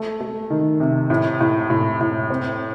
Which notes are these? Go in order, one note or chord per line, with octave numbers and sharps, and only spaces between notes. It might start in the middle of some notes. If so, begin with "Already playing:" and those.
Already playing: A3
A3
D#3
C3
A2
A2
A2
A2
C4